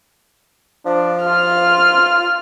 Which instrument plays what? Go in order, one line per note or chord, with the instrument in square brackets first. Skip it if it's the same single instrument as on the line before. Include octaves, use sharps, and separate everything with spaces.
[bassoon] F3 [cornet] D4
[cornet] F4 [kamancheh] F6